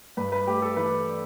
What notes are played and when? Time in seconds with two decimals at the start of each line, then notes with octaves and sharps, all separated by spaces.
0.17 G2 B4
0.32 B4
0.47 A3 G4
0.62 A4
0.76 E3 B4
1.07 D4